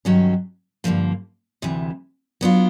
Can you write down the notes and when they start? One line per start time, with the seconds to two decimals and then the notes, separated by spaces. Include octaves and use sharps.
0.05 G2 D#3 F#3 A3 C#4
0.84 G2 D3 F3 A#3
1.62 D2 C3 E3
2.41 F#3 B3 D4 F4